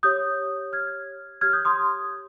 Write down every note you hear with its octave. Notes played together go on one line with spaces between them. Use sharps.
G4 C#5 D#6 G6
F6 G#6
G4 C#5 F6 G#6
D#6 G6
C6 D#6